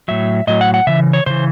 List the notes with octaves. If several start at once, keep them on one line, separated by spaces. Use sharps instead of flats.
A2 F#3 E5
A2 F#3 D#5
F#5
F#5
C#3 E3 E5
C#5
C#3 E3 C5